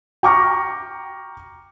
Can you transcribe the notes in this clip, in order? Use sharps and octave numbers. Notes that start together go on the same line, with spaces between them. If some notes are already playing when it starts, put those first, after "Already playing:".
G5 A#5 C#6 D6 F6 A#6